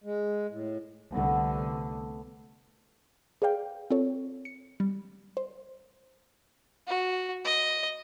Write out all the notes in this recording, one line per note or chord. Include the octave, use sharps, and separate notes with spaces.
G#3
A2
C2 D3 A3 B3
G#4 B4 D5 F5 G5
C4 F4 A4 C#5
C#7
G3
C5
F#4
D#5